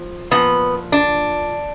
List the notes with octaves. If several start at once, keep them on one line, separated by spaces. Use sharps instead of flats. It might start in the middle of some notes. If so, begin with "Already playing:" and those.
Already playing: F3
A#2 F3 B3
D4